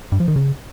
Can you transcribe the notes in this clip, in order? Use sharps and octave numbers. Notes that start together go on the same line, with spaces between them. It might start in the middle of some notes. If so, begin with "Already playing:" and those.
G2
F3
D#3
C#3